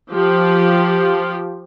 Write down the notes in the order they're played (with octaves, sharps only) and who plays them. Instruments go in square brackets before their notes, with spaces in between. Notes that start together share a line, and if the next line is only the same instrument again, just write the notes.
[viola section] F3 G4